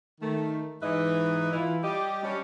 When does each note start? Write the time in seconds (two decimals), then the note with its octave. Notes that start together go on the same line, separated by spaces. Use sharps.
0.21 D#3 A3
0.82 G#2 E3 D#4 B4 D#5 E5
1.52 E3 E4 F4
1.83 G3 G4 D#5
2.23 G3 C#4 D4